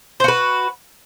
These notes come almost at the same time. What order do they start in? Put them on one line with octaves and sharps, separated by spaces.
C5 F#4 B4